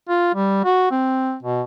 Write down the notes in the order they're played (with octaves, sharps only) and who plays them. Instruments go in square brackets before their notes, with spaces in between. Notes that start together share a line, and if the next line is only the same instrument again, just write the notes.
[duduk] F4
G3
F#4
C4
B2